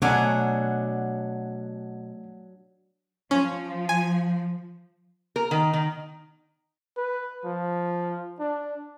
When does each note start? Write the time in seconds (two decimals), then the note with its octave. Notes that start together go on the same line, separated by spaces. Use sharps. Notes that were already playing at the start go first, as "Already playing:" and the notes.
0.02 B2 F#3 A3 D4 F#5 G#5
3.31 F3 C#4
3.89 G#5
5.36 A#4
5.51 D#3
5.73 D#3
6.97 B4
7.44 F3
8.40 D4